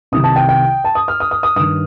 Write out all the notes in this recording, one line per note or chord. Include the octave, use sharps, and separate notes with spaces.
C2 C3 D#3 D#6
A5
G5
G5
A5
D#6
F6
D#6
D#6
D#6
G2 D#3 D#6